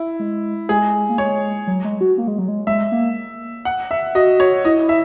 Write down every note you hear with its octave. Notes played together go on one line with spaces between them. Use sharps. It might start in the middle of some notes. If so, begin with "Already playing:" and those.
Already playing: E4
G#3
G#3 G#4
A#3
G#3 C#5
F#3
G#3
F#4
A#3
G#3
F#3
G#3
G#3 E5
A#3
F#5
E5
F#4 D#5
C#5
E4 D#5
E5